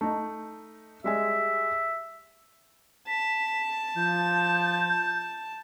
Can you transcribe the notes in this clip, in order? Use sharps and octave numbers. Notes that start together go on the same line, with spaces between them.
A3 D#4
G3 G#3 E5 G#5
A5 B6
F3 G6